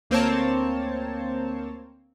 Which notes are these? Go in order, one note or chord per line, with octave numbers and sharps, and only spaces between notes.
D2 A#3 C4 C5 C#5 A5